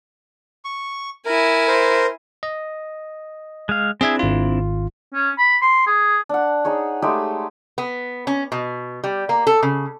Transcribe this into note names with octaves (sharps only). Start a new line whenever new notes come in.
C#6
E4 A#4 G#5
A#4 C5
D#5
G#3 F5
C4 D4 E4 G#4 E5 G#6
G#1 F4
C#4
B5
C6
G#4
D4 F#5
D#4 G#4 C#5
G#3 A3 D#4 G4
B3
C#4
B2
G3
A#3
A4
C#3